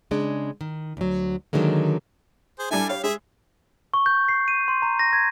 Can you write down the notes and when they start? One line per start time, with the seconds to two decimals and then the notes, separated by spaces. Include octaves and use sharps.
0.11 C#3 G#3 D4
0.61 D#3
0.97 D2 F#3
1.53 D3 D#3 F#3 G#3 A#3
2.59 G#4 C5
2.71 G3 D4 E4 A4 G#5
2.89 G4 C#5 F5
3.04 G#3 G#4 E5
3.94 C#6
4.06 G6
4.29 C7
4.48 D#7
4.68 C6
4.82 A#5
4.99 A#6
5.13 G#6